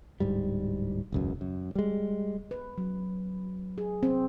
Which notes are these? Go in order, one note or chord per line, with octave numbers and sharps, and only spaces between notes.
D1 G#2 G3
E1 C#2 F#2
F#2
G3 G#3
B4
F#3
G#4
C4